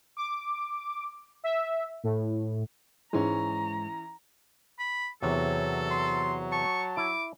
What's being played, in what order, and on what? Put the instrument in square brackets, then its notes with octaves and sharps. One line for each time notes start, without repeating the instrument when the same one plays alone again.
[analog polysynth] D6
E5
A2
[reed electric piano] G#2 G#3 [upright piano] E3 C#4 [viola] A#5
[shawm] B5
[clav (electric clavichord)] E2 C3 [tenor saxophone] F#3 [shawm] A4 [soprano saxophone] C#5
[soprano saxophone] C6
[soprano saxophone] A5 [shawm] C#6
[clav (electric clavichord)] E4 [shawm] D6